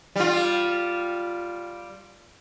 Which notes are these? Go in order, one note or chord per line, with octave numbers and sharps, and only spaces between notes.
G3 F4